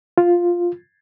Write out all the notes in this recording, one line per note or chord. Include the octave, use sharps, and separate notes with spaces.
F4